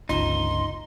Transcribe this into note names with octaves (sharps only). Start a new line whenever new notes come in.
G1 C#2 D#4 F4 A#5 C6